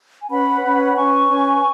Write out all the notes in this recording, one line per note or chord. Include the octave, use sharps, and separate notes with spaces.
G#5
C#4 B4 F#5 B5
C#4 B4
C#4 B4 G#5 C#6
C#4 B4